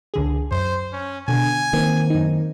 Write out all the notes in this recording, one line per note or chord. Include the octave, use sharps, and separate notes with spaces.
C#2 D3 G#4
F#2 C5
C#4
B2 D3 G#5
D#3 A#3 C4
F#2 D#4